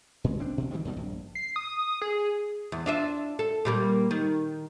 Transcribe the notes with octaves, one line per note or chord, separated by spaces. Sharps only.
A#2 G#3
C#2 C4 D4
A1 B2
D#3 E3 G3
E2 B2 G3
A#1 G2
C7
D#6
G#4
E2
D4 F4 E5
A4
A#2 G3 A#3
D#3